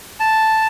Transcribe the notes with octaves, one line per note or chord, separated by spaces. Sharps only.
A5